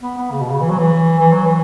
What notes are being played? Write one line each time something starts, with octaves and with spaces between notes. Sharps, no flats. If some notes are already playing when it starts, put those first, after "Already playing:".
B3
B3
C#3
B2
C#3
E3
F#3
E3
E3
F#3
E3